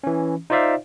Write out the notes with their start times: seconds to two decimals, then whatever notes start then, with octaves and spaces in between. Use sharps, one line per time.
0.04 E3 C#4
0.50 D#4 F4 C5 D5 E5 F5